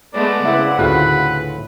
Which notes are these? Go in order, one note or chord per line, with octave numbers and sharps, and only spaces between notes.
G#3 A3 B3 D5
C#3 C4 E4 B4 F#5
D2 A2 F4 F#4 B4